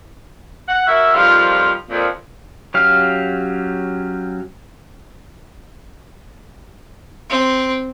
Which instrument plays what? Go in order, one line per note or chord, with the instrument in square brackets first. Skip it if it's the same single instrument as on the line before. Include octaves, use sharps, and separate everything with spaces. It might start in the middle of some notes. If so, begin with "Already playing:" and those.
[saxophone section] F#5
E4 F#4 A#4 E5
F2 D#3 F3 G3 F4 F5
F2 A#2
[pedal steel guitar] F#3 C#4 G4 F5 F6
[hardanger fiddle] C4